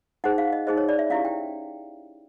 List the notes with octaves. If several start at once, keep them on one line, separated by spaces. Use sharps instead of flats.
D#4 G#4 C5 F#5
F5
D#5
D#4 G#4 C5 D#5
C#5
D5
E5
C#4 E4 G4 F5
G5